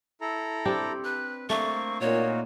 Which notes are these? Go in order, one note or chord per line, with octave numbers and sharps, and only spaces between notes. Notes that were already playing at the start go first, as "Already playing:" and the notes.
E4 A4 A#5
C4 D4 G4
B4 F#6
A3 A#3 C4 D4 C#6
A#2 D#4 F4 F#4 C#5